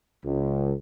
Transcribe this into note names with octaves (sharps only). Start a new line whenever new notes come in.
C#2